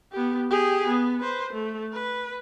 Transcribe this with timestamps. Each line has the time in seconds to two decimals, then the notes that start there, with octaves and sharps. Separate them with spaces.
0.12 B3 G4
0.50 G4 G#4
0.88 B3
1.20 B4 C5
1.53 A3
1.93 B4